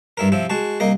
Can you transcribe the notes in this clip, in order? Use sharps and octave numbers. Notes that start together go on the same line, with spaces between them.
G2 E4 A#4
C3 F3 E4
G#3 F#4 A5
C2 A#3 D#5